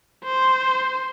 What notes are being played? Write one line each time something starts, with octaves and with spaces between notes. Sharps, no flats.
C5